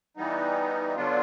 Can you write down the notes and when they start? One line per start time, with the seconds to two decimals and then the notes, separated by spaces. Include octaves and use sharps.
0.17 E3 G3 B3 D#4
0.96 D3 F#3 B3 D4 F4